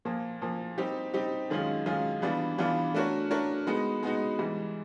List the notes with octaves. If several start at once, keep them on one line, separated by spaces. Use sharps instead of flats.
A#2 F3 A#3
A#2 F3 A#3
G3 C4 D#4 G4
G3 C4 D#4 G4
F#2 D#3 G#3 C#4 F4
F#2 D#3 G#3 C#4 F4
E3 G3 B3 D4 F4
E3 G3 B3 D4 F4
A3 D4 F#4 A#4 C#5
A3 D4 F#4 A#4 C#5
G#3 B3 D#4 F#4
G#3 B3 D#4 F#4
G#2 E3 G3